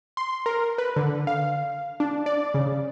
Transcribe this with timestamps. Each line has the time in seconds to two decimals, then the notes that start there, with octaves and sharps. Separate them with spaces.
0.17 C6
0.46 A#4
0.78 B4
0.96 D3
1.27 F5
2.00 D4
2.26 D5
2.54 C#3